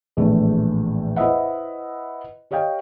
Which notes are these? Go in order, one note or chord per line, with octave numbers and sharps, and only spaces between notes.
A#1 E2 A2 A3
E4 B4 C5 D#5 E5 F#5
G4 C#5 D#5 F5 G5